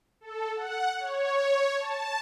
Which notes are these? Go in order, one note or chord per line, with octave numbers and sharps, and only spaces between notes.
A4
F#5
C#5
A5